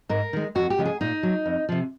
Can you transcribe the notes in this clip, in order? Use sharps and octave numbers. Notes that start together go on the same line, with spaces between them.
G#2 A#4
D#3 G#3
F2 F#4
G4
C#3 F3 G#3
G#4
A#2 D#4
F#3
F2
C3 F3